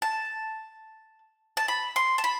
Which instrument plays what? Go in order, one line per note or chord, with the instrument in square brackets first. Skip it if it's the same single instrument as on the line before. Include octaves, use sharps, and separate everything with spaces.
[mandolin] A5
A5
B5
C6
A5
B5